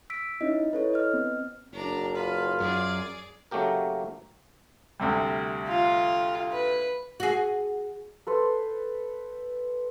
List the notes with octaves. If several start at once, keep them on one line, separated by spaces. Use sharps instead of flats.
E6 B6 D7
C#4 D#4 E4 D#5
E4 A4 B4 C#5
D#5 F6
B3 C4
F#1 D4 A#5
F4 B4
F#2 G#4 D5
C#3 F#3 A3 A#3 G4 A#4
D2 C3 G3
F4
B4
F#4 G#4
A4 B4 C5